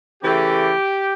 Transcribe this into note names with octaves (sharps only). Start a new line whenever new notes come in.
C#3 E3 A3 G4